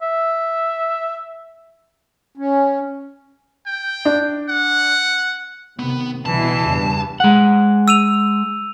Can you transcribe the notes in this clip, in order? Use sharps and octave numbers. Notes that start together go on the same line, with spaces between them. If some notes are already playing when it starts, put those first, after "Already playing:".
E5
C#4
G5
D4
F#5
C3 D#3 B3
C2 B2 D3 E3 E4 A5 C7
A#1 E2 G2 C#3
G#3 F#5
E6 D#7 F7